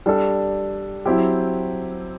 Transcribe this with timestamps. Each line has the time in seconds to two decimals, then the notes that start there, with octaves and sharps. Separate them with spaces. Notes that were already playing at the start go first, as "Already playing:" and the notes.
0.06 G3 D4 A4
1.06 F#3 C4 E4 G4